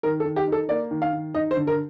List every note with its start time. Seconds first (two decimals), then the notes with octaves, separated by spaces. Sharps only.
0.03 D#3 A#4
0.20 A4
0.25 D#3
0.36 G4
0.47 D#4 A4
0.69 A#3 D5
0.91 D#3
1.02 F5
1.13 D#3
1.35 D#4 D#5
1.51 C5
1.57 D3
1.67 A#4